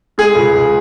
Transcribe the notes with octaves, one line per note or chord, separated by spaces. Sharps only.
G#3 G#4
C#2
C#2